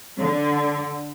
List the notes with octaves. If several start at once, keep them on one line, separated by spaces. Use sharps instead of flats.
D3